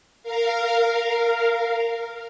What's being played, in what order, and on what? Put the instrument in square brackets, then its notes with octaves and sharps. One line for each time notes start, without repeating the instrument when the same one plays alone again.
[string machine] A#4 F5